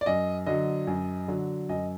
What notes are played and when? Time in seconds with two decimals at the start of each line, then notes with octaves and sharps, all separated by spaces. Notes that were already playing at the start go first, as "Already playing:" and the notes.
0.01 D5
0.06 F#2 D#5
0.46 D3 F#3 D#5
0.87 F#2
1.28 D3 F#3
1.69 F#2 D#5